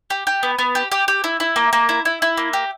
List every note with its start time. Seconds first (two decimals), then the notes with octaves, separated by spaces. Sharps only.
0.10 G4
0.27 G4
0.43 B3
0.59 B3
0.75 G4
0.92 G4
1.08 G4
1.24 E4
1.40 E4
1.56 A#3
1.73 A#3
1.89 E4
2.05 E4
2.22 E4
2.37 A#3
2.53 G4